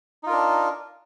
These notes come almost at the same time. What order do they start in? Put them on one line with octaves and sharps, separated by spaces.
D#4 F4 A#4 D4